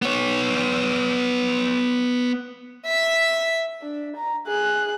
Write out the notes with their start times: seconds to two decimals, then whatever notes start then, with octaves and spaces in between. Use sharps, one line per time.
0.02 B3 C#5
2.86 E5 B6
3.82 D4
4.17 A#5
4.47 G#4 F#6